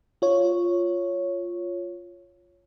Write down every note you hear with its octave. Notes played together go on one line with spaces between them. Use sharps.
F4 C#5